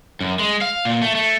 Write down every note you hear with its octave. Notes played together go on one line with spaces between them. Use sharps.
F#2
G#3
F5
A#2
A3
A3